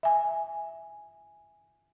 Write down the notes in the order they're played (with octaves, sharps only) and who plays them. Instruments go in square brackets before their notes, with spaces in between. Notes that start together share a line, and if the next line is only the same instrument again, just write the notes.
[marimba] E5 G#5